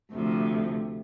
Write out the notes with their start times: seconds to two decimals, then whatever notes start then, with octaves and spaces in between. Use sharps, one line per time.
0.13 D2 C3 F3